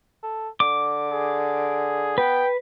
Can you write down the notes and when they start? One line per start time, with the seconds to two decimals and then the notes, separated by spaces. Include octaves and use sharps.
0.23 A4
0.60 D3 D6
1.11 G#4
2.18 B3 B4 G5